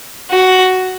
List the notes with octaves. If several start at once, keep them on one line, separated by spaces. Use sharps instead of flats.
F#4